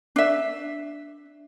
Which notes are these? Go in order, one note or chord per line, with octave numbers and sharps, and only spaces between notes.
D4 E5